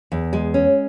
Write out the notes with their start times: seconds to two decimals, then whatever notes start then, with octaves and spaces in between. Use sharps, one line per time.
0.12 E2
0.33 G#3
0.54 C#4